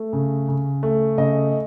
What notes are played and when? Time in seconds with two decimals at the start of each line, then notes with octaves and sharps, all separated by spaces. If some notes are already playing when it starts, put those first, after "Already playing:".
Already playing: A3
0.13 C#3
0.48 C#3
0.83 A3
1.18 C#3 D#5